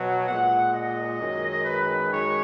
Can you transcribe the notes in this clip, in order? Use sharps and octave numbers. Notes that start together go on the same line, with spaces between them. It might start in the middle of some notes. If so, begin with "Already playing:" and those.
Already playing: B2 F#3
A#2 G#3 F#5
D#5
F#2 D#3 G#3
B4
F#2 D#3 G#3 C#5